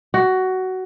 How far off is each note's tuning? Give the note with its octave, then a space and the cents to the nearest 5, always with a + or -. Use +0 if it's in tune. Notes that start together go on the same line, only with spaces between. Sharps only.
F#4 +15